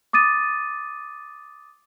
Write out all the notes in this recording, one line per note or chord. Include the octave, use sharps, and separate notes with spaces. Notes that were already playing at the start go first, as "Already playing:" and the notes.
D6 D#6 A6 D#7